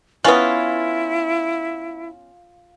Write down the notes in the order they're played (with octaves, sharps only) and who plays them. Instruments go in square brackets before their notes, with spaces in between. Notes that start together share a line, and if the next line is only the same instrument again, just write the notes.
[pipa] B3 C#4 [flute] E4 [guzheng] F4 [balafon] B4 G#5